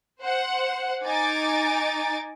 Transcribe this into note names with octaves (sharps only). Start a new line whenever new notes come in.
C5 F#5
D#4 G#5 D6 A6